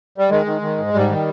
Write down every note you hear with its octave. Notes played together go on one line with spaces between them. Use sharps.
G3
D#3 G#3
D#3
D#3
G#2
G#2 G3
D#3